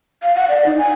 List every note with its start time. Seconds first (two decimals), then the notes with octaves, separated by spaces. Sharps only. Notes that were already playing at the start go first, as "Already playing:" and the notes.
0.22 F5
0.36 F#5
0.49 D5
0.66 D#4
0.78 G#5